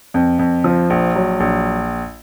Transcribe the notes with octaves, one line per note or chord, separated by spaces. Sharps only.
F2
F2
F3
A#1
F#3
A#1